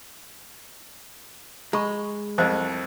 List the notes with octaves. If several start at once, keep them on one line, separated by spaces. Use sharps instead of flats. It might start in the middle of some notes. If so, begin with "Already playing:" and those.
G#3 A#5 B5 C#6
C2 F2 C5 D#5